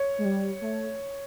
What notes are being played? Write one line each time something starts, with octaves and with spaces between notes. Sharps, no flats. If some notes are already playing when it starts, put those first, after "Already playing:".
Already playing: C#5
G#3
G3
A3